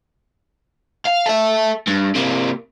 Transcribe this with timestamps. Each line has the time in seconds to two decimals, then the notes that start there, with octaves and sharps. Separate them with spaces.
1.05 F5
1.26 A4 E5
1.88 G2
2.15 C3 A#3